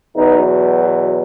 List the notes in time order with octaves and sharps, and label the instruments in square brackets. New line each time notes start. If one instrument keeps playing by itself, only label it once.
[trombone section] E2 B2 F#3 B3 D#4